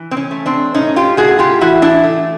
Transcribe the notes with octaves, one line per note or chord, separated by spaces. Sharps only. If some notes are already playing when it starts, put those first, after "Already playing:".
Already playing: E3
C4
C#4
A3
C4 D4
A2 C#4 D#4
F4 G4
A2 F#4 G#4
F4 G4
E3 E4 F#4
D4 E4
A3